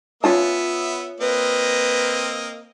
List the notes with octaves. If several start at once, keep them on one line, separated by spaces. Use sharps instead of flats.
B3 C#4 F4 E5 A5
A#3 C4 B4 D#5